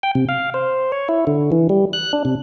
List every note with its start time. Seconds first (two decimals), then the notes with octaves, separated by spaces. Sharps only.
0.03 G5
0.15 C3
0.29 F5
0.54 C5
0.92 C#5
1.09 E4
1.27 D3
1.52 E3
1.69 G3
1.93 F#6
2.13 D4
2.25 C3